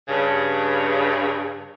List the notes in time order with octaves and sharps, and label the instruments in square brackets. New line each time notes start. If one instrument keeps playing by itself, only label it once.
[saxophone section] G2 C#3